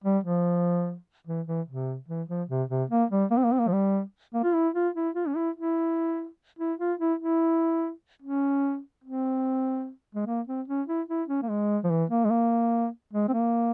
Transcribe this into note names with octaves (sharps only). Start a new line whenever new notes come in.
G3
F3
E3
E3
C3
E3
F3
C3
C3
A#3
G3
A#3
C4
A#3
C4
A#3
F3
G3
A#3
F4
E4
F4
E4
F4
C#4
E4
E4
E4
F4
E4
E4
C#4
C4
G#3
A#3
C4
C#4
E4
E4
C#4
A#3
G#3
F3
E3
A#3
G#3
A#3
G#3
C4
A#3